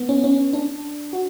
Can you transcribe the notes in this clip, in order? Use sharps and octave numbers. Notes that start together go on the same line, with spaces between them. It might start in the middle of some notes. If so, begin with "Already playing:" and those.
Already playing: B3
C#4
C#4
D4
F#4